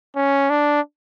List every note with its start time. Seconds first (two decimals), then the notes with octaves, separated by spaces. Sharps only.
0.16 C#4
0.50 D4